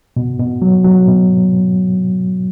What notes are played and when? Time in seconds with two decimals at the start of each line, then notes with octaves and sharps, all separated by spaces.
0.17 B2
0.40 B2
0.62 F#3
0.84 F#3
1.07 B2